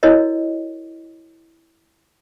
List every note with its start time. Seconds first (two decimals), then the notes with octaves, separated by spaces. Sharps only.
0.03 E4 F#4 A#4 C#5 D#5